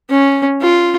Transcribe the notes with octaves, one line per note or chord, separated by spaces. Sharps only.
C#4
F4